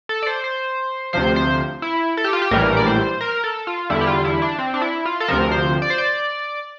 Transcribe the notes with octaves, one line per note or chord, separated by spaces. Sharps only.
A4
D5
C5
C5
D2 C3 F3 C5
C5
E4
A4
G4
F4
G4
A#1 A2 E3 G3 A#4
D5
C5
A#4
A4
F4
E2 D3 G3 E4
G4
F4
E4
D4
C4
D4
E4
F4
A4
D2 C3 F3 A#4
C5
D5
C5
D5